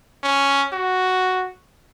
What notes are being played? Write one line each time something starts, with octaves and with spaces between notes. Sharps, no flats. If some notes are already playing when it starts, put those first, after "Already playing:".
C#4
F#4